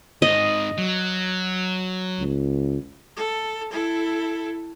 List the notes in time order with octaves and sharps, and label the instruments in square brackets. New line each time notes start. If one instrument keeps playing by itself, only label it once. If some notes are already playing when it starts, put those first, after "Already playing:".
[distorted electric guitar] G#2 D#3 [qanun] D#5
[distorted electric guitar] F#3
[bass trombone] C#2
[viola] A4
E4 A4